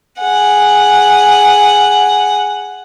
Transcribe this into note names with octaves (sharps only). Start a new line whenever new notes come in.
G#4 F#5